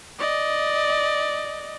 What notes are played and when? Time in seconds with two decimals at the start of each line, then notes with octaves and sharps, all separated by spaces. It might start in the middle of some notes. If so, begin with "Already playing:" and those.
0.19 D5 D#5